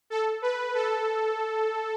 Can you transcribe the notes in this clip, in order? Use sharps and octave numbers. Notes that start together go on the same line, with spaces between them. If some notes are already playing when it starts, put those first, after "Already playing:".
A4
B4
A4